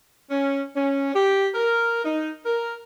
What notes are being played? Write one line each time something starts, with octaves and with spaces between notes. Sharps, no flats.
C#4
C#4
G4
A#4
D#4
A#4